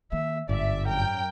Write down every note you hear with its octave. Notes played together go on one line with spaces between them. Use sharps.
D#3 A#3 E5
G1 G#2 D5 E5
F#2 A#4 G5